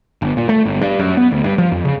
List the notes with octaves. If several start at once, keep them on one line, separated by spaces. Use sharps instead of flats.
G1
A#2
A3
G1
G2
F#2
B3
D2
G2
F3
F2
C#3